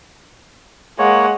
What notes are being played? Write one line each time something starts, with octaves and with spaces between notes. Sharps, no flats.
G#3 A#3 C#5 F#5